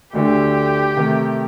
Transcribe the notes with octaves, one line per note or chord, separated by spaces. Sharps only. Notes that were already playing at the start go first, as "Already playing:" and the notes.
D2 D3 A3 G4
C3 D#3 A3